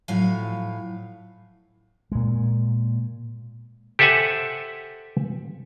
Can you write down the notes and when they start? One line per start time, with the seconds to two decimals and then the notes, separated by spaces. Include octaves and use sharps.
0.08 A2 F3 F#3 E5 F5 G#5
2.12 A#2 G#3
3.99 G4 A4 C5 E5 F#5 G#5